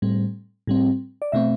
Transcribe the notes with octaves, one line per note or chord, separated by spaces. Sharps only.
A2 G3 C4
A2 G3 C4
D5
B2 A3 C4 E5